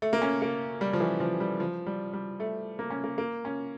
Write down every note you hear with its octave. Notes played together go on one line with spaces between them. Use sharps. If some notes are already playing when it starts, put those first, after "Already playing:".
A3
A#3
C#4
A#3
G3
F3
E3
F3
G3
F3
G3
G3
A3
A#3
C#4
A#3
A#3
C#4